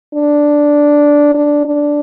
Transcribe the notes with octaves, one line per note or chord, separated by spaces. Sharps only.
D4
D4
D4